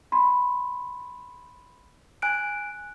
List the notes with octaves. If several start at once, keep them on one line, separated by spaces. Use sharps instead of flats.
B5 C6
G#5 F#6 D7